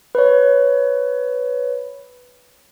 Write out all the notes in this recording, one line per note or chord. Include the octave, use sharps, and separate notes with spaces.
B4 C#5